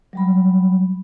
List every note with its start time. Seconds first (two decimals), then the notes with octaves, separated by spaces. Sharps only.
0.13 F#3 G3 B5